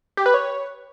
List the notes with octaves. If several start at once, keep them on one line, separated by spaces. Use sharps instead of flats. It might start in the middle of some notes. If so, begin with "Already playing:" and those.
G4
B4
C#5